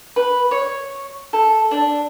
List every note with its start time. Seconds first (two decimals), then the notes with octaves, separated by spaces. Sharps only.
0.16 B4
0.51 C#5
1.33 A4
1.71 D4